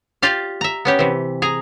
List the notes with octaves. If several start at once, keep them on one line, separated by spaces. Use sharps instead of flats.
F4 G4 D5 F5
E5 A#5
B3 C#4 G4
C3 E3
G#4 A#5